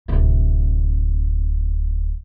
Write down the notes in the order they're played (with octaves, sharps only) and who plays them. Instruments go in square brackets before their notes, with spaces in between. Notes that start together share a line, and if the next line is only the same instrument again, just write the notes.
[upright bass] D1 C3